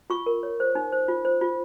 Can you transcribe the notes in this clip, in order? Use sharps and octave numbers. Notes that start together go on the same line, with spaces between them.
F4 C#6
A#4
C#5
C5
D#4
C5
F4
C5
F4